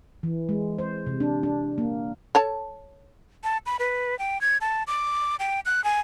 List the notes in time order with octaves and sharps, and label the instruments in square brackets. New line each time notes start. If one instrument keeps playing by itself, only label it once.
[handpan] E3
G#3
C5
C3
D4
D4
A#3
[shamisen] A4 C#5 A5
[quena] A5
B5
B4
G5
G#6
A5
D6
G5
F#6
G#5